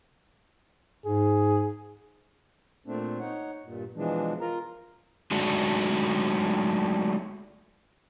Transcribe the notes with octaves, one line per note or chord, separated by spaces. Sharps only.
G#2 G#4
A#2 A3 C4 D4
D#4 C#5 F#5
G2 A#2
B2 E3 F3 G#3 D4
F4 A#4 A#5
F#3 G#3 A3 D4 D#4 F#4